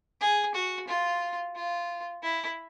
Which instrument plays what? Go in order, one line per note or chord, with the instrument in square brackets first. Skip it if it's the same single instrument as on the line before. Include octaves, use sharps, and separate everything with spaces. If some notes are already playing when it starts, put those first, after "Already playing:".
[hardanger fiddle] G#4
F#4
F4
F4
E4